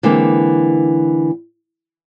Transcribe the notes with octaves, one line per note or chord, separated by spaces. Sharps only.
D3 E3 G#3 A#3 C4